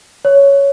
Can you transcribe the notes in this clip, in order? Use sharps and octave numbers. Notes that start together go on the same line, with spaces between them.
C#5